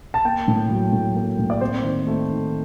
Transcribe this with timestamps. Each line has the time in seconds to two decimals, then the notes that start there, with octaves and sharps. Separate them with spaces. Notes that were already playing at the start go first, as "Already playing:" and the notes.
0.14 A5
0.25 A#3 G5
0.48 A2
0.71 F#3
0.93 A2
1.16 A#3
1.39 A2
1.50 D5
1.61 C4 C5
1.83 D#3
2.07 A3
2.29 D#3